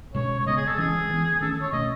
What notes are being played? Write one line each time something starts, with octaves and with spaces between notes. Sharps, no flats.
B2 G#3 C#4 C#5
C#5
C#3 G#3 B3 D#5
G#4
A4
E3 G#3 C#4 G#4
E3 B3
D#3 A3 C#4 A4
A4
C#5
B2 A3 C#4 D#5